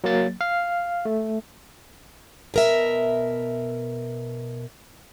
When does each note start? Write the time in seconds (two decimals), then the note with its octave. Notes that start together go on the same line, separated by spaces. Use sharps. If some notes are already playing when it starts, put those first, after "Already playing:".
0.04 F#3 A#3 A6
0.41 F5
1.05 A3
2.54 B2 A#4 E5